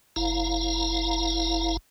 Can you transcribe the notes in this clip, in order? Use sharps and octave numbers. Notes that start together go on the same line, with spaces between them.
F#1 E4 F5 A#5